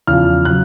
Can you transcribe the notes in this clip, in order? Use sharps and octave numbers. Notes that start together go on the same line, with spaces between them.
E2 C#3 F3 F6
C#3 F#3 F#6